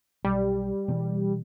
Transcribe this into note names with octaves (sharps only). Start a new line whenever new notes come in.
B1 G3
B2 E3 B3